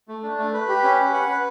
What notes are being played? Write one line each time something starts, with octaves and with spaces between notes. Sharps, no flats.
A3
D4
A3
B4
G4
C#4
B4
F#5
B4